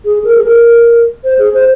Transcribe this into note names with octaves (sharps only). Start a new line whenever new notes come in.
G#4
A#4
G#4
A#4
C5
G#4
C5